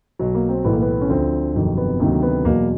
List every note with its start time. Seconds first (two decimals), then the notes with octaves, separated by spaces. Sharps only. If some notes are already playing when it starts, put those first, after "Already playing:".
0.19 B1 B2 F#3
0.35 A#3
0.49 C4
0.65 B1 A2 E3 B3
0.73 A#3
0.82 B3
1.02 C#4
1.09 D2 D3 F3 C4
1.54 G1 F2 C3 D#3 F#3
1.77 B3
2.00 D2 C3 D#3 F#3 A#3
2.22 B3
2.45 E2 B2 F#3 A#3